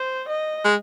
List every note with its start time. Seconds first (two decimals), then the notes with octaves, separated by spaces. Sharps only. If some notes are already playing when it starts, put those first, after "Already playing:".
Already playing: C5
0.29 D#5
0.65 G#3